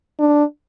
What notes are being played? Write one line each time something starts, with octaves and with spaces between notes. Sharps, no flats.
D4